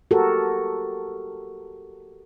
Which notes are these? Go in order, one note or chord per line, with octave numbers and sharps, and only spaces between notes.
F#4 G4 A4 A#4